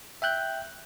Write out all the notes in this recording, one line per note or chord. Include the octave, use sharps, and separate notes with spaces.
E5 G5 F#6 G6